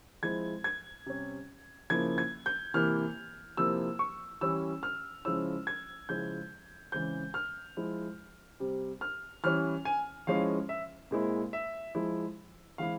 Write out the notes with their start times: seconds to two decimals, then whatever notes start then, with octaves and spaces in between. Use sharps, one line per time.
0.23 F3 G#3 C4 E4 G#6
0.64 G#6
1.06 C3 G3 C#4
1.90 C#3 F3 A#3 E4 G#6
2.18 G#6
2.46 G6
2.74 C3 E3 A#3 E4 F6
3.57 C3 F3 A#3 E4 E6
3.99 C#6
4.41 E3 G3 C#4 E4 E6
4.83 F6
5.25 C#3 F3 G#3 C#4 E4 E6
5.67 G#6
6.09 C#3 F3 G#3 C#4 E4 G6
6.92 C#3 E3 G#3 C4 G6
7.34 F6
7.77 F3 G#3 E4
8.60 C3 G3 C4
9.01 F6
9.44 E3 G3 C#4 E4 F6
9.85 G#5
10.27 F3 G#3 C#4 E4 F5
10.69 E5
11.11 A#2 G#3 C4 E4
11.53 E5
11.95 F3 G#3 E4
12.78 E3 G#3 C4 E4 F5